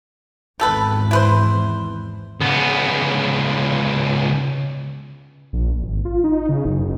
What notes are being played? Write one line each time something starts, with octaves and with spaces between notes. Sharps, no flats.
G#1 E2 D#3 E3 A4 B4
E4 B4 C5
C#2 B3
A#1
G#1
F4
D#4
C#3
F#1